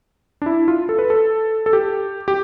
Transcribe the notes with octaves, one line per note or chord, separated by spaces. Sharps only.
D4
E4
F4
A4
B4
A4
A4
G4
G4